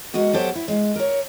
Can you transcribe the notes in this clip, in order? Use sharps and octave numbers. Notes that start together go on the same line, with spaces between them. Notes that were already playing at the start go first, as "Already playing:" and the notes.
G#3 A#3 B3 F#4 D#5
F#3 B3 G4 A4 C5 D5
E4
G#3 D#5 F5
A#4 C#5